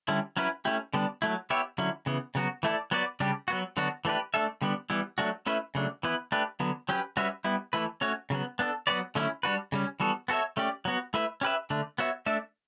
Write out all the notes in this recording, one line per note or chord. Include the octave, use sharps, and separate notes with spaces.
D3 G3 C#4 E4
F#3 C#4 E4 B4
A3 C#4 E4 G4
D3 G3 B3 D4
F#3 A3 E4
B3 E4 G4 C#5 E5
D3 F#3 C#4 E4
C#3 E3 B3
C#3 F#3 B3 F#4
E3 A3 E4 A4 D5
F#3 B3 F#4 B4 D5
C#3 G3 D4 G4
F#3 B3 F#4
D3 F#3 B3 D4 F#4
E3 A3 D4 G4 B4
A3 D4 A4 E5
D3 G3 B3 D4
E3 G3 B3 E4
F#3 A3 D4 F#4
A3 C#4 E4 B4 E5
C#3 F#3 A3 D4
E3 B3 E4 B4
A3 D4 G4 B4
D3 F#3 B3
F#3 C#4 G4 B4
G3 C#4 F#4 B4 E5
G3 B3 E4
E3 A3 E4 B4
A3 C#4 F#4 C#5
C#3 F#3 B3
B3 D4 A4
F#3 B3 F#4 B4 D5
D3 F#3 A3 C#4 E4
G3 D4 F#4 B4
C#3 G3 C#4
E3 G3 B3 F#4 A4
B3 F#4 A4 C#5 E5
A3 C#4 G4 D5
F#3 B3 F#4
A3 E4 B4 E5
C#4 G4 B4 E5
D3 A3 D4
B3 F#4 C#5 E5
A3 D4 A4 E5